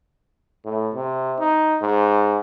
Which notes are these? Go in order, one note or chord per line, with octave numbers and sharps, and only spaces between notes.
A2
C3
D#4
G#2